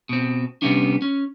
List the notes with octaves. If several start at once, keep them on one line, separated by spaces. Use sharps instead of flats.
B2 C4
C3 G3 A#3 B3 C#4 D4
C#4